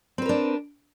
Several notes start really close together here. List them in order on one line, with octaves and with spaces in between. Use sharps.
C4 B4 A#4 D4